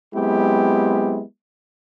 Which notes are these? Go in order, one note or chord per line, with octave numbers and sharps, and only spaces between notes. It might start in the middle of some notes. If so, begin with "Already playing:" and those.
F#3 G#3 B3 C4 E4 G4